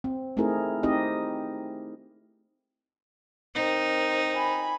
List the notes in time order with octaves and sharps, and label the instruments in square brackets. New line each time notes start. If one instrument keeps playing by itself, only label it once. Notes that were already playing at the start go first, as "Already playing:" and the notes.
[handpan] C4
A3 C4 D#4 E4 G#4 A#4
C4 D#4 G4 D#5
[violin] C4 A#4 [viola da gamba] D#4
[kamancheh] G#5 B5